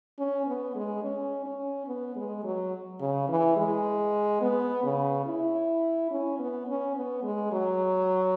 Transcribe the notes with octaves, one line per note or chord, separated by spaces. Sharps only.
C#4
B3
G#3
C#4
C#4
B3
G#3
F#3
C#3
E3
G#3
B3
C#3
E4
C#4
B3
C#4
B3
G#3
F#3